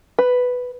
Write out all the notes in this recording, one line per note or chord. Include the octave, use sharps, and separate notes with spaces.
B4